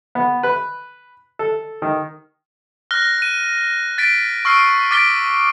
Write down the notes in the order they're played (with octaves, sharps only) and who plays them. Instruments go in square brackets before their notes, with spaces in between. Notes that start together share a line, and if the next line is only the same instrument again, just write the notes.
[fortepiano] B3
B4
A4
D#3
[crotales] F6 F#6 A#6 G7
F#6 D#7
A6 B6 D7
C#6 E6 F6 C7 D7
D6 F6 A6 B6 D7 G7